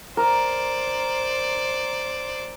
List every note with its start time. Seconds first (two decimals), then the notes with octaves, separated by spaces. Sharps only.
0.17 A#4 C5 D5